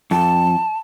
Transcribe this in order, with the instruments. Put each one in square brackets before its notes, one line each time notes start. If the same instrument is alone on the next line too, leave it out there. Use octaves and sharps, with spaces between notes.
[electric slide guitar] F2 [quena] A5